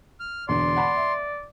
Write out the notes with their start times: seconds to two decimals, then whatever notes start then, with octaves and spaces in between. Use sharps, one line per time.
0.20 F6
0.49 E1 D3 D5 C6
0.76 F#5 A5 B5
0.96 E5